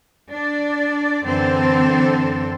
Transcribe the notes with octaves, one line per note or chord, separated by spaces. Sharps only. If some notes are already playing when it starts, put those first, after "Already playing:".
D4 D5
F#2 D3 E3 C4 A4 C5